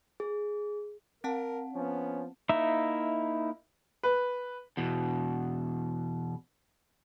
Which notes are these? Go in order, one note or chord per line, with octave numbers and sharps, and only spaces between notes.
G#4
C4 A#4 F#5 A5
F3 B3 C#4
A#3 D#4 E4 E5
B4
E2 B2